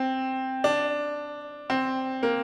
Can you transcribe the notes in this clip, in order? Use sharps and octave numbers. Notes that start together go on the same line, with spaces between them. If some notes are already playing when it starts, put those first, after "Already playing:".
Already playing: C4
D4
C4
A#3